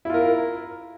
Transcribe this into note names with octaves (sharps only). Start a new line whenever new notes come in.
E4 F4 A#4